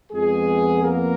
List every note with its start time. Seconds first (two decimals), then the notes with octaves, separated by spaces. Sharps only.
0.11 F2 F3 G#3 B3 G#4
0.82 A#3 A#4